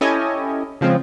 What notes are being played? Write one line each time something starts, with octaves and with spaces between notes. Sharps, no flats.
C#4 E4 G4 A4 D#5 G#5
C#3 F3 G#3 C4